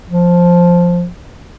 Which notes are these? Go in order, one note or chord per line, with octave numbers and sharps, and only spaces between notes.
F3